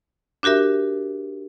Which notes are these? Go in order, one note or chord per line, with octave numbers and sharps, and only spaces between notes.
D4 F#4 G4 A#4 E5